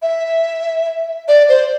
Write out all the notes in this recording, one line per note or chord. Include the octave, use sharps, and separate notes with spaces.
E5
D5
C5